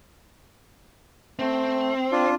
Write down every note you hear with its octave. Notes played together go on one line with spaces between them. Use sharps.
A3 C4
D4 F4